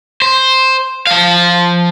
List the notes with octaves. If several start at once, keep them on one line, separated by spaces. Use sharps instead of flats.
C5
F3 F5